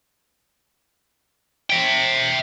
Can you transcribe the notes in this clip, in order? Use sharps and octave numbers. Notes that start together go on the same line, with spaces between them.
E5 G5